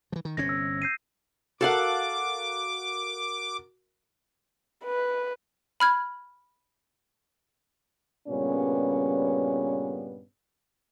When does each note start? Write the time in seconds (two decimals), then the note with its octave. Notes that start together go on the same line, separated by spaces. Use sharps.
0.12 E3 F3
0.25 D#3
0.37 G1 C3 C#4 G#6 A#6
0.49 E6
0.82 G6 C7 D#7
1.61 F#4 A4 A#4 F5 F#5 D6
4.85 B4
5.80 B5 F6 G#6
8.28 G2 A#2 C#3 G3 B3 C#4